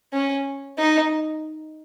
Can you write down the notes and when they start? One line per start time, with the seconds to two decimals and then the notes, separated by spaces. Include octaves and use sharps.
0.13 C#4
0.78 D#4